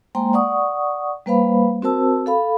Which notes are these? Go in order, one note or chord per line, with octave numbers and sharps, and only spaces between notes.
G#3 A#3 C5 G5 A#5 C6
D5 F#5 C#6 D#6
G3 A#3 B4 C5 F5 B5
C4 F#4 A#4 C5 A5 E6
A4 F5 B5